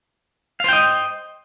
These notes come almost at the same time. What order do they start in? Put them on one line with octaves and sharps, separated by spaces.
F5 C5 G5 D#5